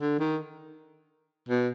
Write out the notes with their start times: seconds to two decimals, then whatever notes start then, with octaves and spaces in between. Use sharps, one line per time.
0.01 D3
0.19 D#3
1.49 B2